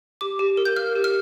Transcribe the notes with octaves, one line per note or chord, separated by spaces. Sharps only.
G4 D6
G4
A#4
G6
F5 F6
G4
F6